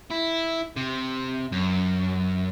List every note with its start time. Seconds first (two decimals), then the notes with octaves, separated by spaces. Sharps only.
0.10 E4
0.76 C3
1.52 F#2